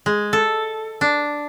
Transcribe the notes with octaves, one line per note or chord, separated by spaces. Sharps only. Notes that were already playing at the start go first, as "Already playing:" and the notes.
G#3
A4
D4